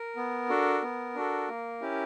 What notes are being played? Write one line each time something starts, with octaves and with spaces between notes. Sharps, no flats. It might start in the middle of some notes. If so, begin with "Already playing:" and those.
Already playing: A#4
B3
D4 F#4 A4
B3
D4 F#4 A4
A#3
C#4 E4 G4